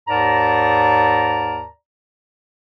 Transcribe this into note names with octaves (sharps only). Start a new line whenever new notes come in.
D#2 G#2 A#4 D5 A5 A#5